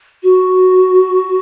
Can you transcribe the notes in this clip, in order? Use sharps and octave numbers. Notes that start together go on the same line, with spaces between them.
F#4